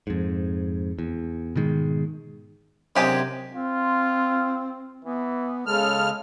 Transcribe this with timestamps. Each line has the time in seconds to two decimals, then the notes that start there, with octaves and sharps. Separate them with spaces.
0.07 F2 G#2
0.99 E2
1.55 G#2 B2 D#3 G#3
2.96 F#2 C3 G#3 D4 G4 G#5
3.55 C4 F4
5.05 E3 B3
5.67 C#3 G#3 A4 F6